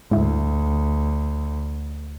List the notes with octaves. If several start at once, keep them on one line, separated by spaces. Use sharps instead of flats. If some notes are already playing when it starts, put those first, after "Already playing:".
D2 G#2 E4